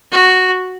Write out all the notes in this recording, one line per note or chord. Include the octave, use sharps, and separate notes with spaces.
F#4